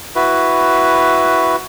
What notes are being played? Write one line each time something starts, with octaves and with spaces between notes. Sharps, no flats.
E4 F#4 B4